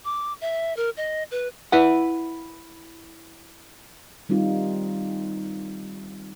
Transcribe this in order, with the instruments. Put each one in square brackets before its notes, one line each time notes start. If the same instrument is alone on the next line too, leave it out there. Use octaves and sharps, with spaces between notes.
[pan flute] D6
E5
A#4
D#5
B4
[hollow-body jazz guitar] E4 B4 F#5
[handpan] D#3 G3 C4 D#4 F4